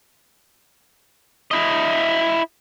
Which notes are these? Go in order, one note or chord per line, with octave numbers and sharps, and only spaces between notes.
E4 D#5